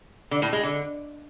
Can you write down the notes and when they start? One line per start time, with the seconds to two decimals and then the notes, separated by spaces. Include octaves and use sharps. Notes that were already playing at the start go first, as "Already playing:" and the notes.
0.31 D3
0.42 A2
0.53 G#3
0.63 D3